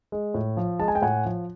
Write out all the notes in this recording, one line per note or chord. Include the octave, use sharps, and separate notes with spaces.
G#3
A2
F3
G#3 A5
G#5
G5
A2 F#5 G#5
F3